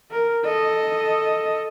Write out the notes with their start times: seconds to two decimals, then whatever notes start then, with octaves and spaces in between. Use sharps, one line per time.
0.11 A#4
0.45 A4 D#5